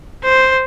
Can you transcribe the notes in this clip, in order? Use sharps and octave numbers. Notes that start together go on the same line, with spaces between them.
C5